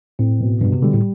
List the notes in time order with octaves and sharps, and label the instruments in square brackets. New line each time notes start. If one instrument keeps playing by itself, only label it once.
[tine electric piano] A2 [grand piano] C4
[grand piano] B2
[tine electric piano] G2 [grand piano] B2
[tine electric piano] C3
[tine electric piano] D3 [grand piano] G3
[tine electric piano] A2